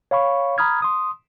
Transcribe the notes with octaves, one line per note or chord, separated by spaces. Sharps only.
C#5 F5 B5 C#6
A#5 B5 D#6 F6 G#6
C6 D#6